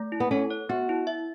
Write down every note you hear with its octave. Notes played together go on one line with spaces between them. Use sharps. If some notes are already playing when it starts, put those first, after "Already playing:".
Already playing: A3
E4
B3
C#4 A4
C#5
B3 F#4
E4
E5